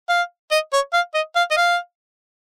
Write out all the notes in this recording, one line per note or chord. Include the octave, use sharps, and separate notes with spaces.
F5
D#5
C#5
F5
D#5
F5
D#5
F5